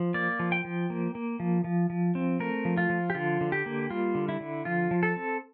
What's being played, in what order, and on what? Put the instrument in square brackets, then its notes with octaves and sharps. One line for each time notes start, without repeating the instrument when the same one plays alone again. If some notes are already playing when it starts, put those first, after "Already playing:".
Already playing: [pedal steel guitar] F3
A#3 D5
F3
G5
F3
A#3
A#3
F3
F3
F3
C4
A3 A#4
F3
F4
F3
G4
D3 F4
D3
G4
A#3
G3 F4
D3
E4
D3
F3 F4
F3
A4
C4